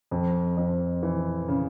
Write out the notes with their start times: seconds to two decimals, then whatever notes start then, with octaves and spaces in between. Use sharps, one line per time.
0.11 F2
0.57 F2
1.03 E3
1.48 C#3